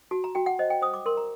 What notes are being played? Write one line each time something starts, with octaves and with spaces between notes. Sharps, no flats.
F#4 A5
A#5
F#4 G5
F#5
C5 D#5
G5
C5 D#6
D6
A#4 C6
A#5